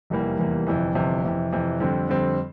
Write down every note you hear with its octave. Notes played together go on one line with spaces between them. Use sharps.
F1 E2 E3 G3 A#3
F1 E2 E3 G3 A#3
G1 F2 C3 E3
G1 F2 C3 E3
F2 C3 E3
F2 C3 E3
F2 D3 G3 C4
F2 D3 G3 C4